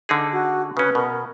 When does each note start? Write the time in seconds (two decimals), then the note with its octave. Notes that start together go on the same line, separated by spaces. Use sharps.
0.09 D3 D#4 G#4
0.32 F#4
0.77 C#3 C#4 B4
0.95 B2 A#4